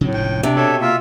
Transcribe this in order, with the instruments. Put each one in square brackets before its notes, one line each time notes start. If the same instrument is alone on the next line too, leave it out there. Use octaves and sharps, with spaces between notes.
[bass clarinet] A2 [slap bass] C#3 F#3 C4
[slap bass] F1 C#2 D3 [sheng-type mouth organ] G5
[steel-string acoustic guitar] C3 [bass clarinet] D4
[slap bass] B2 [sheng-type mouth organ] A4 C#5 E5
[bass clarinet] A#3 [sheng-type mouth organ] F4 E5